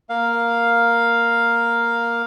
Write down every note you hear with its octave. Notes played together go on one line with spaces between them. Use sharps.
A#3 F5